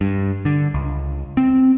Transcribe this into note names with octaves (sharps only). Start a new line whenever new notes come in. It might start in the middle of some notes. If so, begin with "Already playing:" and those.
G2
D3
C#2
C4